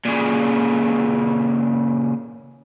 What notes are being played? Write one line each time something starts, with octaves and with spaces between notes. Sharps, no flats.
A#2 C#3